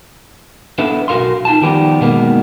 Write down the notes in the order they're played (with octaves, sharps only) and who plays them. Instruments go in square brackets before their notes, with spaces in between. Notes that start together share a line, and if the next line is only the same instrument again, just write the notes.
[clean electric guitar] B3 D4 E4 A4 B4
B1 F#4 A#4 F5 C6
D#4 F4 G#5 A5
D#3 F3 G3 B3 G4 B4
B2 D#3 G#3 A#3 B3